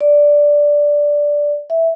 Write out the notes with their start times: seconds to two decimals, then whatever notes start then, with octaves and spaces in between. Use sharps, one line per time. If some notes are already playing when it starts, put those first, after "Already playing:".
0.01 D5
1.70 E5